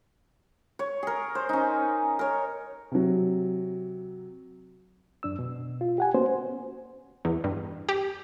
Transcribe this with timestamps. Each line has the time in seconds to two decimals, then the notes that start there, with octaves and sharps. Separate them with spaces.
0.79 C#5
1.03 G#4 A#4
1.35 C5
1.49 C#4 D#4
2.19 A#4 C#5
2.91 C3 F#3
5.23 F#2 D4 E6
5.39 B2
5.81 F4
5.98 G4 F#5 G#5
6.14 A#3 B3 C#4 F#4 C5
7.25 E2
7.44 G2
7.89 G4